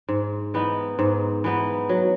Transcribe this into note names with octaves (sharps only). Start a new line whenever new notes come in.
G#2
E3 B3 D#4
G#2
E3 B3 D#4
F#3